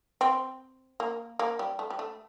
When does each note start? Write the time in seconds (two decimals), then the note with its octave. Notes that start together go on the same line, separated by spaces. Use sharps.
0.21 C4
1.00 A#3
1.39 A#3
1.59 G3
1.79 A3
1.90 G3
1.99 A3